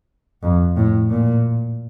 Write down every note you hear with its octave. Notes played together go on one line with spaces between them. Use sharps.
F2
A2
A#2